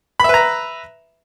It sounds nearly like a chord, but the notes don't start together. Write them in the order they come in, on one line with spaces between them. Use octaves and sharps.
B5 E5 B4 A#5